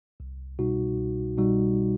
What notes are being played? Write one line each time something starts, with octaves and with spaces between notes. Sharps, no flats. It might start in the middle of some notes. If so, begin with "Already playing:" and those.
C2
B2 G3 D#4 F#4
C2
B2 G3 D#4 F#4